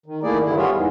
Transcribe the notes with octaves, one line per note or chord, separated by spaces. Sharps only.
D#3
D#3 A3 A#3 E4 G#4 D5
G2 D3 D#3 E4
G3 B3 F4 G#4 C#5 E5
E2 G#2 E3